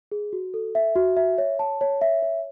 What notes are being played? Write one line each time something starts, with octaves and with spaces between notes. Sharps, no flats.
G#4
F#4
A4
E5
F#4
E5
C#5
A5
C#5
E5
C#5